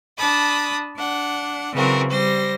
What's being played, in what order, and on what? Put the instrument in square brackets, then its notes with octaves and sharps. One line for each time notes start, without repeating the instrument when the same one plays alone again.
[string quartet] D4 A5 B5 D#6
D4 F#5
C#3 E3 F#3 C4 F#4 A#4
G3 C5 A#6